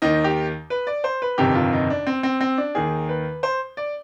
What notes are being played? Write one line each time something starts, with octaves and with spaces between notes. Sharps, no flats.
D#2 D#3 D#4
G4
B4
D5
C5
B4
G1 F2 C3 D#3 G4
F4
D#4
D4
C4
C4
C4
D4
D#2 D#3 G#4
B4
C5
D5